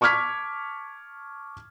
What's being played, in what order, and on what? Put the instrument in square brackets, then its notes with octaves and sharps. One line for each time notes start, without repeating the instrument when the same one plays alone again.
[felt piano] A5 C#6 D6 F6 G#6 B6